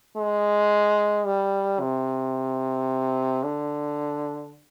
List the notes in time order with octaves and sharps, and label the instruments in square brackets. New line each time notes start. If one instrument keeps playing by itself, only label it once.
[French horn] G#3
G3
C3
D3